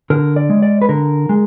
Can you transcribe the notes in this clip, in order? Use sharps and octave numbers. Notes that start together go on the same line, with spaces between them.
D3 A#4
D5
G#3
D5
B4
D3 A#4
G#3